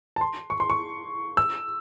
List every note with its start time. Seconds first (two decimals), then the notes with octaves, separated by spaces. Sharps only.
0.16 A5
0.21 C6
0.50 C#6
0.60 C6
0.70 C#6
1.37 E6